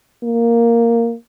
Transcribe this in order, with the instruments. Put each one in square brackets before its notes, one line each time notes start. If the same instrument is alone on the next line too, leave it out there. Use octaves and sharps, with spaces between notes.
[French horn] A#3